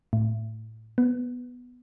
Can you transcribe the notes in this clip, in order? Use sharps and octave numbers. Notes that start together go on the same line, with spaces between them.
A2
B3